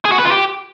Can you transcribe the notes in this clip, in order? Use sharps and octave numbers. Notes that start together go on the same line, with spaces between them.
G#4
F#4
B4
F4
G4